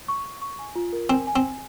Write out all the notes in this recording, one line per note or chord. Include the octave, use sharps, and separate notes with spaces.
C#6
C#6
C#6
G#5
F4
A#4
C4 G#5
G#5
C4
G#5